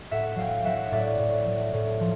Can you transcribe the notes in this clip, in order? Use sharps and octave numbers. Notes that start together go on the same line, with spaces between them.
A2 E5 F#5
F#3 F5 G5
G5
F#3 E5 F#5
A2 D5 E5
A2
F#3
A2
F3